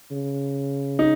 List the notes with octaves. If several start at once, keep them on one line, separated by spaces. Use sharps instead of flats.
C#3
D#4